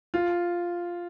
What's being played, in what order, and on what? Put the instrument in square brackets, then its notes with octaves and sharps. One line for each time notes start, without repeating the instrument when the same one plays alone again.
[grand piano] F4